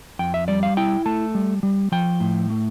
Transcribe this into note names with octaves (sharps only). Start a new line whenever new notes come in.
F2 G5
E5
G3 D5
F5
E4 G5
A3 A5
G3
G3
F3 G5
A2
A3